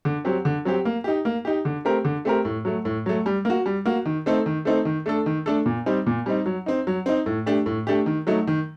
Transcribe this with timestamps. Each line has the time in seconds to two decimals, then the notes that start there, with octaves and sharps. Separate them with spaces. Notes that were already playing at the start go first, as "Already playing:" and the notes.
0.05 D3
0.25 F#3 C4 G4
0.45 D3
0.65 F#3 C4 G4
0.85 A#3
1.04 D#4 G4
1.25 A#3
1.45 D#4 G4
1.65 D3
1.85 A3 C4 G4 A#4
2.05 D3
2.25 A3 C4 G4 A#4
2.45 A2
2.65 F#3 A3
2.85 A2
3.06 F#3 A3
3.26 G3
3.45 A#3 F#4
3.66 G3
3.85 A#3 F#4
4.05 D#3
4.26 A3 C4 D#4 A4
4.46 D#3
4.65 A3 C4 D#4 A4
4.85 D#3
5.06 A3 D4 A4
5.26 D#3
5.46 A3 D4 A4
5.66 A#2
5.86 G3 C4 D#4
6.07 A#2
6.26 G3 C4 D#4
6.46 F#3
6.66 C4 D#4
6.87 F#3
7.06 C4 D#4
7.26 A2
7.46 A3 D4 G4
7.66 A2
7.87 A3 D4 G4
8.06 D#3
8.27 F#3 A3 D#4
8.47 D#3